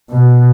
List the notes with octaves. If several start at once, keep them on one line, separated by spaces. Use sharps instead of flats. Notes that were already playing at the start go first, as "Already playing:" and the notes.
B2